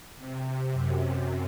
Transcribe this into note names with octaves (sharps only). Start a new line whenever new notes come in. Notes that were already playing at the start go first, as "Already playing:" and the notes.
C3
F#2